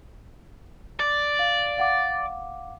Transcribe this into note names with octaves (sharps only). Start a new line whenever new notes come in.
D5
F5
F5 F#5 D6